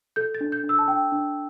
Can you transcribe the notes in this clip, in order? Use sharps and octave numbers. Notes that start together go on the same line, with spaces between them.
A4 G6
A6
D4
G6
D4
E6
A5
D4 G5
D4